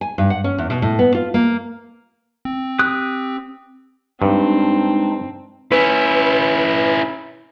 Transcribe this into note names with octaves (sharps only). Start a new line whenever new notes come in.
G#5
G2
F#5
C#4
E2
B2
A2
B3
F4
A#3
C4
G4 D#6 F#6
G2 G#3 C4 D4 D#4
C#4 E4 B4